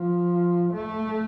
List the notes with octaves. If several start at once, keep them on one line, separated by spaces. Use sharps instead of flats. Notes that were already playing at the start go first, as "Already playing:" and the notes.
Already playing: F3
A3